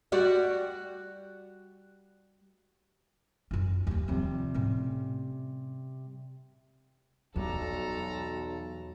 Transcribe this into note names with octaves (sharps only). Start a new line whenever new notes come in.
G3 F#4 D5
F#2 C#4
D#2 A#3
C3 D#3 F3 G3
A2 C#4
B1 E2 F#3 G3 A4 A#5